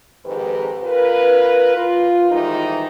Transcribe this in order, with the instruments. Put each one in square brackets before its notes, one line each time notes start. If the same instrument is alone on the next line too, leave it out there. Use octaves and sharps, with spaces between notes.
[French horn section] F2 G#2 D#3 G4 B4
F4 A#4 B4
F4
G#2 D#3 E3 G3 D#4